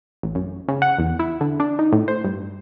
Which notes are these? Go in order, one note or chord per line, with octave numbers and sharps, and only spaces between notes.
A1
F#2
C#3
F#5
E2
E4
D3
D4
D#4
A2
C5
G2